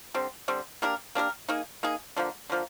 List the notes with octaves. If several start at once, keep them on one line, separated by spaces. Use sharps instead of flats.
D3 G3 C4
D3 G3 C4
A#3 D4 G4 A#4
A#3 D4 G4 A#4
A#3 D#4 G#4
A#3 D#4 G#4
D3 F3 A#3
D3 F3 A#3